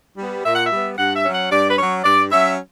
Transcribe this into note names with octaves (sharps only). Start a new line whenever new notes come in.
G3 B3
A#2 E5
F#5
E5
G3 B3
G2 F#5
E5
F#3 C#4
F#5
G2 D5
B4
F#3 C#4 C#5
G2 D5
F#3 C#4 E5